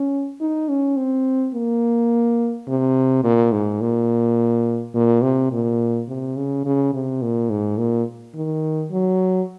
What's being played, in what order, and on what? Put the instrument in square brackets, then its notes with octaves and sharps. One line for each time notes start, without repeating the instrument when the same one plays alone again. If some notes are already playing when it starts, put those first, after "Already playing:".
Already playing: [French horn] C#4
D#4
C#4
C4
A#3
C3
A#2
G#2
A#2
A#2
C3
A#2
C3
C#3
C#3
C3
A#2
G#2
A#2
D#3
F#3